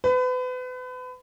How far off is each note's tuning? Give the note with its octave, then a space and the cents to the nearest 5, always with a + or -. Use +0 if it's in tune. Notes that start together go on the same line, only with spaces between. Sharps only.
B4 +35